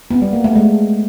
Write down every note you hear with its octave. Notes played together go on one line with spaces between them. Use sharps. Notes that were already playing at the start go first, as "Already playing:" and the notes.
B3
G3
A#3
A3
G#3